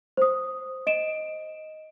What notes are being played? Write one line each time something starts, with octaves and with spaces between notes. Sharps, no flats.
C5 D#6
D#5 D7 E7